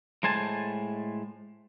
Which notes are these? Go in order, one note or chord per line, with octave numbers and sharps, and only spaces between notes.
A2 G#3 C5 G#5 A5